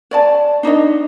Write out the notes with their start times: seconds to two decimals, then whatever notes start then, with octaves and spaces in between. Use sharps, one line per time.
0.11 C#5 D5 A5
0.63 D4 D#4 C#5 D#5